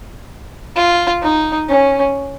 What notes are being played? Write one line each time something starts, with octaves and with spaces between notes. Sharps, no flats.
F4
D#4
C#4